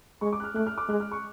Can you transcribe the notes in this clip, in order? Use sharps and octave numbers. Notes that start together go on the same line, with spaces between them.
G#3 C#6
D6
F#6
F6
A3 F#6
F6
D6
G#3 F#6
F6
C#6